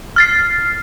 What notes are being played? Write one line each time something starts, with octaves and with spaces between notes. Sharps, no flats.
F6 A6 C7